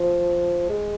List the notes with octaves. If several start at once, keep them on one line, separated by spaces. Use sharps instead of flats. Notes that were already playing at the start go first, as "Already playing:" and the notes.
Already playing: F3
G#3